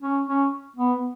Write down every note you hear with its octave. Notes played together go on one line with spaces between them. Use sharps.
C#4
C#4
B3